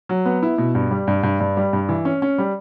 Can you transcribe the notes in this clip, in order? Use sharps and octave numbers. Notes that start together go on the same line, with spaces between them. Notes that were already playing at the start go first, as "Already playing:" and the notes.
F#3
B3
E4
B2
G2
G3
G2
G2
G2
G3
G2
E3
C#4
C#4
G3